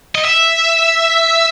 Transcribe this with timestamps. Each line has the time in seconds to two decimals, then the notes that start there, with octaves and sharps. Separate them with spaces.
0.15 D#5
0.25 E5